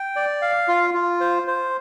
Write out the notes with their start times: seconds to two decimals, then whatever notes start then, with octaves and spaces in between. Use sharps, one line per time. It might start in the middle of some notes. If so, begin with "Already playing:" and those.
Already playing: G5
0.16 D5
0.42 F5
0.68 F4
0.94 F4
1.20 C5
1.47 C5